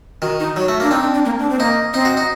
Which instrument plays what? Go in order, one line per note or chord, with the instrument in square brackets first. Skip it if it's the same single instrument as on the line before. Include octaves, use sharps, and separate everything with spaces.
[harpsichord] D#3 [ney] F#4
[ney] D#4
[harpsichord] F#3 [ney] F#4
[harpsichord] A3
[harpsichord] A#3 [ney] D4
[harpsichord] C4 [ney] D#4
[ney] D4
D4
A#3
D4
C4
[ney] A#3 [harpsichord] D#4
[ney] C4 [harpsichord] D#4
[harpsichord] F#4
D#4